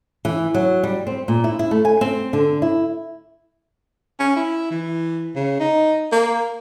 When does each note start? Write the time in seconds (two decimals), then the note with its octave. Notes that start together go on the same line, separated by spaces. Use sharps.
0.25 E3
0.54 F#3
0.83 G3
1.07 C4
1.28 A#2
1.44 E4
1.59 E4
1.71 A3
1.85 G#5
2.01 C4
2.33 D3
2.62 E4
4.20 C#4
4.36 E4
4.71 E3
5.36 C#3
5.60 D#4
6.12 A#3